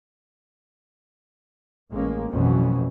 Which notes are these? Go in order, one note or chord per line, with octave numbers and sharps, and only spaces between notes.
A1 G#3 A#3 C#4
A1 F2 B2 E3 F#3 C#4